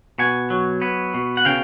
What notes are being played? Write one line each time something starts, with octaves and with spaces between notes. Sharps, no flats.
B2 F#5 G#5
F#3
B3
B2
F#5
C#3 F5 G5